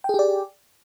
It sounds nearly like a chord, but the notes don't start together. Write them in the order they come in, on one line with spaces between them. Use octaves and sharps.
G5 G#4 G4 D5